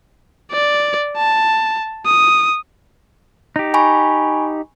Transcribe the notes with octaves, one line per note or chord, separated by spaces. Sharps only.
D5
A5
D#6
D#4 G4
G#5 B5 C#6